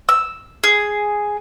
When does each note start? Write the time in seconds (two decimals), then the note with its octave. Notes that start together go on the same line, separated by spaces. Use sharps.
0.09 E6
0.64 G#4